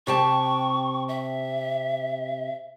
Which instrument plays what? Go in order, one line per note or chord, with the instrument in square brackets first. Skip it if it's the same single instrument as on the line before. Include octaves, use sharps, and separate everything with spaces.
[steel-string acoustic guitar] C3 G4 A5 [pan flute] C#6
[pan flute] E5